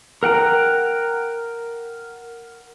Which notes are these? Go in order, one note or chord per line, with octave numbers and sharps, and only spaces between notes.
A#4 F#5 G5 A#5